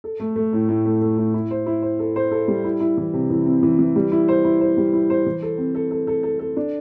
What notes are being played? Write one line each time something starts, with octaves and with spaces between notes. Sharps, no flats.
A4
A3
A3
A2
A2
A3
A3
A2
E4
C5
E4
C5
A4
C5
A4
G3
E4
E4
E3
C3
E3
C4
E3
E3
G3
E4
C5
E4
C5
G3
E4
C5
E3
A4
C4
A4
A4
A4
A4
A4
D4